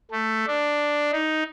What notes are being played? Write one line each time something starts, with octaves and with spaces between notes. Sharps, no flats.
A3
D4
D#4